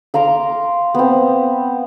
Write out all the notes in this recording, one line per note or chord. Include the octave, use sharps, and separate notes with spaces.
F5 A#5 C6 D6
B3 C4